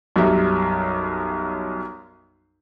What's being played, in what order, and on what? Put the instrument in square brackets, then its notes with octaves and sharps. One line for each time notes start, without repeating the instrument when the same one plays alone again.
[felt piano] B1 F#2 G3 E5